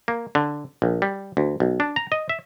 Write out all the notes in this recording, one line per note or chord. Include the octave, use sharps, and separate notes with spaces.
A#3
D3
A#1
G3
D2
B1
D4
A#5
D#5
E5